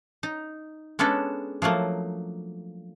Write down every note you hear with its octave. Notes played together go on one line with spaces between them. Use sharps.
D#4
G#3 B3 C#4 D4 A4
F3 F#3 A3 A#3